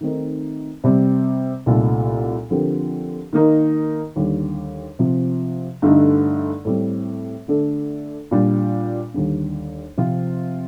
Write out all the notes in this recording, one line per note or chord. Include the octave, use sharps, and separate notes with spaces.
D#3 A3 C4 D#4 A#4
C3 G3 C4
C2 A#2 A3 D#4 A4
D3 F3 C4 G4 A#4
D#3 A#3 D#4 A#4
D#2 D3 G3
C3 F3 C4
G2 D3 A3 D#4
A2 G3 C4
D3 A3 D4 A4
A#2 G3 D4
D#2 D3 G3 D4
C3 F3 C4 F4